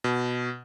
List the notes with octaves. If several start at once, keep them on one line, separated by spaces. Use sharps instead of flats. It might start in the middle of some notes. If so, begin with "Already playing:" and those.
B2